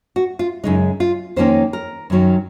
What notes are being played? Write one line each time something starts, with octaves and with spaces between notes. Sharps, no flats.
F#4
F4
F#2 C#3 G#3 D#4
F4
F2 D#3 A#3 C#4 C5
A#4
F#2 D#3 F#3 C#4